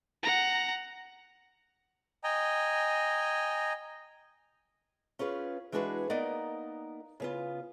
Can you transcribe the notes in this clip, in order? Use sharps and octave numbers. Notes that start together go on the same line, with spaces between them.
F#5 A#5
D#5 G5 G#5 A#5
C#4 F4 G#4 B4
E3 G#3 D4 F#4 G#4 B4
A#3 B3 D#4 A#4 D5 D#5
C#3 B3 F4